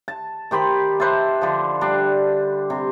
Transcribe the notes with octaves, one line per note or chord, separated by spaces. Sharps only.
A5
D#3 G4 C5 B5
B4 C5 E5 A5
D3 F3
G3 D4
C3